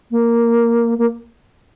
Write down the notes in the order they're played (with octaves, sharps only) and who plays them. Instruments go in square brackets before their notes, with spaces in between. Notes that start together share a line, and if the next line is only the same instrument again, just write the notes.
[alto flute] A#3
A#3